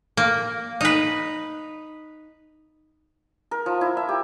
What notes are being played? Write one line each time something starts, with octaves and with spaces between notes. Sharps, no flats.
A#3
D#4 B4
A#4
F3
E4
E5
G4